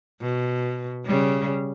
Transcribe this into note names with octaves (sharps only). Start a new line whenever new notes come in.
B2
C#3 G3